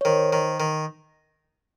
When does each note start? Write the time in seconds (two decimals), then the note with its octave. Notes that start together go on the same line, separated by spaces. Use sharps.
0.01 C#5
0.05 D#3 A#4 C5
0.33 D#3
0.60 D#3